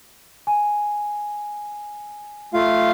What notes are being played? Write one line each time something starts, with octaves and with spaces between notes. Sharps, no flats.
G#5
A3 F4 F5